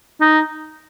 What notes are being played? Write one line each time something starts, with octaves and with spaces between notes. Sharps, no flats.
D#4